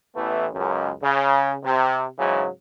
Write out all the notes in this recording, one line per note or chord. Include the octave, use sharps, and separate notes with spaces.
A1 E3 A3 B3
C#2 F#2
C#3
C3
G#2 C#3 E3 F#3